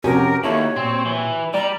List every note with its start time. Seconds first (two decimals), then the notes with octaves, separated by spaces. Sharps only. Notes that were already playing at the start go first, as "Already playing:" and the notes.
0.04 F2 C3 C#4 F#4 G4 A#4
0.44 D#2 E4 A4 C#5
0.76 A#2 C4
1.06 E3
1.54 G3 D5 A#5